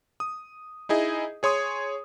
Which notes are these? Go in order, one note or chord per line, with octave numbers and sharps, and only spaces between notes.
D#6
D#4 E4 G#4 D#5
G#4 C#5 C6 D#6